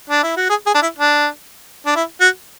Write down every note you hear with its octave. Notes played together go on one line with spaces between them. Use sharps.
D4
E4
F#4
G#4
G#4
D4
E4
D4
D4
E4
F#4